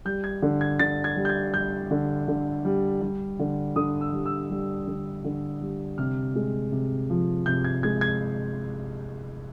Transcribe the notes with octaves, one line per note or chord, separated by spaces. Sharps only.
G3 G6
G#6
D3
G#6
D3 A6
G#6
G3
G6
G#6
G3 G6
D3
D3
G3
G3
D3
D3 D#6
E6
G3
E6
G3
D3
D3
G3
C3 F6
G#3
C3
F3
C3 G6
G#6
G#3 G#6
G#6